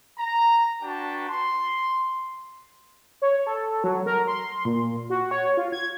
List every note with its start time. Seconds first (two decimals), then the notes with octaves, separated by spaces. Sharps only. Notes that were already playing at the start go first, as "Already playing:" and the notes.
0.18 A#5
0.82 D4 F#4 B4 G5 A5
1.29 C6
3.22 C#5
3.47 A4
3.84 F#3
4.06 A#4
4.28 C6
4.65 A#2
5.10 F#4
5.31 C#5
5.57 F4
5.72 G#6